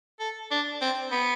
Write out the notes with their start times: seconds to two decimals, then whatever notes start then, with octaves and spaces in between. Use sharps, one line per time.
0.20 A4
0.51 D4
0.81 C4
1.12 B3